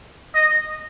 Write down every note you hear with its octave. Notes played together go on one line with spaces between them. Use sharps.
D#5